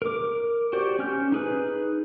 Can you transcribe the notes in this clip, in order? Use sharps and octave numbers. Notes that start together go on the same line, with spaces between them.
A#4 D6
F#4 G4 C5 D5
C#4 F6 G6
D#4 G#4 B4